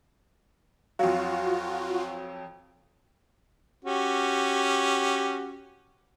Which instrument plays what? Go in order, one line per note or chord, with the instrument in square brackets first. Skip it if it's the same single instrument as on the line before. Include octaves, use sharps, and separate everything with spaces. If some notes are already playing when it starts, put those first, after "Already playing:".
[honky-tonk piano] F2 F#3 [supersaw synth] F4 F#4 [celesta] F5
[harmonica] C#4 F#4 G4